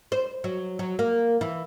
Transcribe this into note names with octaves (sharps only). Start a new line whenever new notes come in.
C5
F#3
F#3
A#3
E3